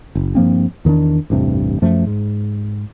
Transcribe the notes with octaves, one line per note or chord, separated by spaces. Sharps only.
F#1
G2 F3 A#3 C4
E2 D#3 A#3 D4
A1 E2 G2 C3
F#2 F3 A3
G#2